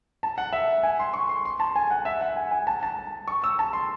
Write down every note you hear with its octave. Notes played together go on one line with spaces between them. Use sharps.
A5
F#5
E5
G#5
C6
C#6
C6
C6
A5
G#5
F#5
E5
F#5
G#5
G#5
A5
A5
C#6
E6
A5
C6